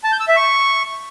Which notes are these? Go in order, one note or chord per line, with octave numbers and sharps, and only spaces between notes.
A5
G6
E6
E5
C#6